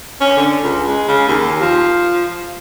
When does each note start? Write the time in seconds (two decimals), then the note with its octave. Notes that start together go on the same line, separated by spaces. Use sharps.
0.21 C#4
0.37 D3
0.63 C#2
0.87 G#3
1.08 C#3
1.28 D#2
1.61 F3